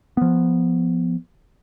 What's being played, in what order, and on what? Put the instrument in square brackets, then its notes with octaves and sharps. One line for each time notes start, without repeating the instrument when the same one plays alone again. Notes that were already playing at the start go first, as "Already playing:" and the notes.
[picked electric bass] F3 B3